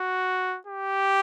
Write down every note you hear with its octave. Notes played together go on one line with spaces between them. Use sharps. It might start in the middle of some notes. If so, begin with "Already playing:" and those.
Already playing: F#4
G4